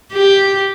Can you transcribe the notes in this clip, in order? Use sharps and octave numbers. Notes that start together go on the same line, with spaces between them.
G4